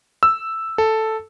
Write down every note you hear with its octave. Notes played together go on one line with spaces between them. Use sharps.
E6
A4